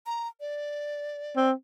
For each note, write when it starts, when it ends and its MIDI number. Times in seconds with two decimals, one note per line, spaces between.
0.06 0.28 82
0.40 1.48 74
1.36 1.52 60